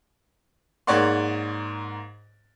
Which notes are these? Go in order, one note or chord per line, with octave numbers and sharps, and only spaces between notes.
G#2 A#3 C#5 D5 F#5 C6